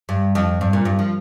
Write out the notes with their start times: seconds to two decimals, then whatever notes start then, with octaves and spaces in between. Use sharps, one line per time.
0.09 G2
0.35 F2
0.61 G2
0.73 A#2
0.85 G2
0.99 F3